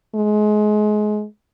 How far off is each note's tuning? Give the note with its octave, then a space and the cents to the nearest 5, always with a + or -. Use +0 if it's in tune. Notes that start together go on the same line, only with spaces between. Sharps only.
G#3 +25